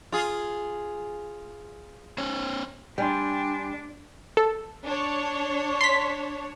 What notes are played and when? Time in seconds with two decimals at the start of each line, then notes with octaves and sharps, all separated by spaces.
0.12 F4 G#4
2.18 C#4 C5 C#5
2.98 G3 D4 G5 G#5 C6
4.37 A4
4.85 D4 C#5
5.81 C6 B6